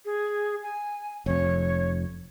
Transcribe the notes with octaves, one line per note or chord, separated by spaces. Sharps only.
G#4
G#5
F1 F2 C#5